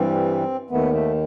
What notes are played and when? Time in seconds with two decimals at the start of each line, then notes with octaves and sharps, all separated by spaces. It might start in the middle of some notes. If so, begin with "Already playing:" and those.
Already playing: G2 E3 G3 C4
0.70 D#2 D#3 A3 B3
0.93 A3